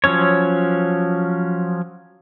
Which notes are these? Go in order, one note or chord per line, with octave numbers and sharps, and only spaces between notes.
F3 F#3 C#4 C#5